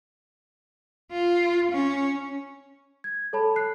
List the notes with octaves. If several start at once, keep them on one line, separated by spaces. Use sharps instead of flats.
F4
C#4
G#6
A4 C#5 A5 B5
F#6 C7